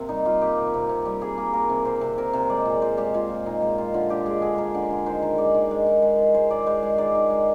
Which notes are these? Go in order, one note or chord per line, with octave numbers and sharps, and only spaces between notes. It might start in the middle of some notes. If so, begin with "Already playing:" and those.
Already playing: C3 A#3 C4 A#4
G3 D#4
G3 F4
A#3 G4
C3
C3
C3
G3
A#3 G#4
A#3
A#3 A#4
C3
C3 C5
C3
C3 A#4
C3 C5
G#3 D5
A#2
A#2 C5
G#3 G4
G#3 F4
A#2
A#2 D#4
G#3
G#3 F4
D3 F4
D3 G4
G#3 G#4
D3 G#4
G#3 A#4
D3
D3
D#3 C5
D#3
G#3 D5
D#3
G#3
D#3
G#3
D#3
G#3 C5
D#3 D5
G#3 C5
G#3
D#3 D5
D#3
G#3